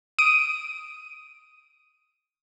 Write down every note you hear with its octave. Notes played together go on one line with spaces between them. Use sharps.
D#6 D7 D#7